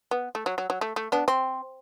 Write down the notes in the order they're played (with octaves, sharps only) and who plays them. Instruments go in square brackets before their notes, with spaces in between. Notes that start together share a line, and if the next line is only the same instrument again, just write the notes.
[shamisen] B3
A3
F#3
F#3
F#3
A3
A3
B3 D4
C4